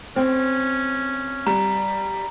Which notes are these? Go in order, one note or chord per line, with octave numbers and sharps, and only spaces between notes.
C4 C#4
G3 A#5